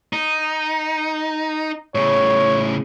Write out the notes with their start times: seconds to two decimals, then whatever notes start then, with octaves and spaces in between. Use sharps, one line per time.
0.13 D#4
1.95 A2 C#3 C#5